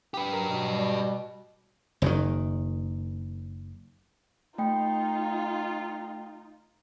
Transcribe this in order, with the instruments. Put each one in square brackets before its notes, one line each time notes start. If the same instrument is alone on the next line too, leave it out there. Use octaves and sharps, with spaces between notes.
[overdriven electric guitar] G4 B4
[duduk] F#3 [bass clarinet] A#4
[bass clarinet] B2
[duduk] G3
[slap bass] F#1 F#2 A#2 D#3
[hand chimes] A3 G5 [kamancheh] D#4 F4